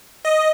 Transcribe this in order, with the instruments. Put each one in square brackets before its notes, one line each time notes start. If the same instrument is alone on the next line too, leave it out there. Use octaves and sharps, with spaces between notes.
[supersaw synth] D#5